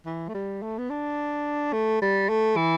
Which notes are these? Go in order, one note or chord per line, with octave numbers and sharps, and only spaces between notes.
E3
A3
G3
A3
B3
D4
A3
G3
A3
E3